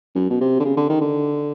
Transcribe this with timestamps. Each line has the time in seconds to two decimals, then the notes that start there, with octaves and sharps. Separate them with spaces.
0.15 F#2
0.30 B2
0.41 C3
0.60 D3
0.64 C#3
0.77 D3
0.89 D#3
1.01 D3